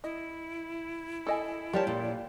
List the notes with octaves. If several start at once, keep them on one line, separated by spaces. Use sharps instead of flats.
E4 D#5
A4 D#5 G#5
G3 F4 G4 A#4 C#5 A5
A#2